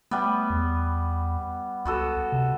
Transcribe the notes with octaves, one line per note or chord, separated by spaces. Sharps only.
G3 A3 B3
E2
C#2 B3 F#4 A4
C3